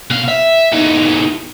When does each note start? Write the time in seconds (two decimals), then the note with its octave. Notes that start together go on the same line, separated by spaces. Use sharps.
0.10 B2 F5
0.28 E5
0.72 E2 D#4